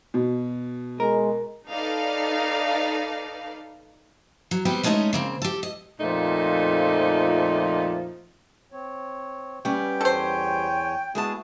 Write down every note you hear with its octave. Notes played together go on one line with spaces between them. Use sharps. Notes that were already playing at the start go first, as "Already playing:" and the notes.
B2
G#3 A#4
D#4 A4 B4 D5 F5
F#3
G3 B3 C4 G4
G#3 A3 C#4 D#4 D#5 E5
C#3 A#3 C4
G4 A4
D#5
F2 A#2 F3 A3 D#4
C4 C#5
G3 B3 C#4 G5
E2 A4 C5 C#5 G#5
G#3 B3 E4 F#4 G#4 A5